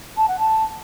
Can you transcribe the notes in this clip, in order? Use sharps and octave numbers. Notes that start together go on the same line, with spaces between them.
A5
F#5
A5